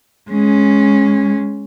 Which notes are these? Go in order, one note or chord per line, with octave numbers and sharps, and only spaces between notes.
G#3 C#4